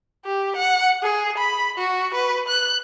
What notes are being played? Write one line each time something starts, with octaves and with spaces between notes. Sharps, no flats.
G4
F#5
G#4
B5
F#4
B4
F#6